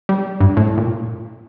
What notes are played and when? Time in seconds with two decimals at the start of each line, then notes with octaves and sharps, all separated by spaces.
0.09 G3
0.40 G2
0.57 A2
0.77 A#2